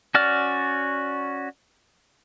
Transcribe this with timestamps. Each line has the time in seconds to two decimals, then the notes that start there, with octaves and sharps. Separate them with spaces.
0.15 C#4 F#4 D5 F6